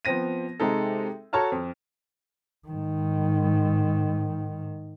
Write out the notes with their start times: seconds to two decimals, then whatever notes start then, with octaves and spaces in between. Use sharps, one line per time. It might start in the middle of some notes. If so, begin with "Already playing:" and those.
0.05 F3 B3 C4 A#6 D#7
0.60 C3 G#3 D#4 A4
1.33 F#4 A4 C#5 A5 A#5 F6
1.52 F2
2.68 G#2 D#3